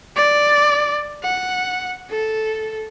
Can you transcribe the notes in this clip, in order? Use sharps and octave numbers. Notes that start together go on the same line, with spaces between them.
D5
F#5
A4